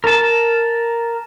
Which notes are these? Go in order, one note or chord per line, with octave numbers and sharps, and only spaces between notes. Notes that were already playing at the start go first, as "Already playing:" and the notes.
A#4 A5